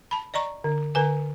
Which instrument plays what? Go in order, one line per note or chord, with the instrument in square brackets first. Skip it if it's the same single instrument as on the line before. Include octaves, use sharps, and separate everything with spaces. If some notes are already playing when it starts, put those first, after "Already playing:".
[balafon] A5 B5
D5 D#5 A#5 C#6
D3
D3 B4 G#5